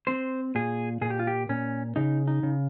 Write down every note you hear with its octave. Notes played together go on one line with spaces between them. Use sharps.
C4 C5
A#2 G#4
A#2 G#4
G4
F4
G4
A#2 C#4
C#3 D#4
D#4
C#3